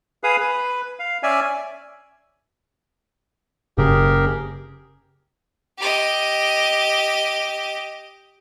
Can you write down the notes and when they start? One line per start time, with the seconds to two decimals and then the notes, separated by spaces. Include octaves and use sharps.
0.24 G#4 B4 F5 D#6
0.40 B4
0.99 F5
1.23 C#4 D5 E5 G#5
3.78 F#1 C#3 G4 G#4 A#4
5.78 G4 D#5